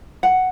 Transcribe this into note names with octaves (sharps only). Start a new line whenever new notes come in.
F#5